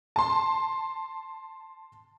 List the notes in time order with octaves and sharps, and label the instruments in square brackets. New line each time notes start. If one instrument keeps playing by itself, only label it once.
[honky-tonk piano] A5 C6